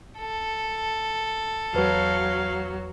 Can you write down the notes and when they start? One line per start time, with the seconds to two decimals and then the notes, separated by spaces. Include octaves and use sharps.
0.19 A4
1.75 E2 F#3 B4 F5